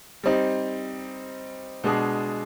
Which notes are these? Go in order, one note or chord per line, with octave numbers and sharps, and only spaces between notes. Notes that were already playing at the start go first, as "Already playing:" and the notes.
G3 C4 D#4
B2 G#3 D4 G#4